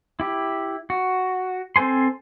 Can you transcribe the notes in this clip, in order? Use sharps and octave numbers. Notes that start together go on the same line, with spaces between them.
E4 G4
F#4
C4 A4 C5 G#5 C6